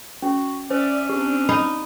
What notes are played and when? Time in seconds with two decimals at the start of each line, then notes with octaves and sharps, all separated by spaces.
0.22 C#4 F#4
0.70 C#4 C5 D5 E5
1.09 C4 D4 G4
1.49 D#4 B5